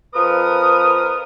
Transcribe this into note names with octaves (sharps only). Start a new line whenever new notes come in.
F2 F3 A#4 B4 D#6